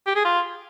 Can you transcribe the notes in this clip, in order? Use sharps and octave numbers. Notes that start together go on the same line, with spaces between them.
G4
G#4
F4